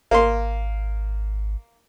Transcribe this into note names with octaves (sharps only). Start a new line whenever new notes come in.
G#1 A#3 C6